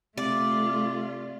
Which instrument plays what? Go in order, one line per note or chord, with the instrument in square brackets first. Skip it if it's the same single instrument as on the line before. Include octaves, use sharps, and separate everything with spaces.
[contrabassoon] C3 [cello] A3 F4 [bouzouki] D5